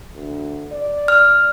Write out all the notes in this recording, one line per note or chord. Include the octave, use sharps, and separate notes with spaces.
D2
D5
F6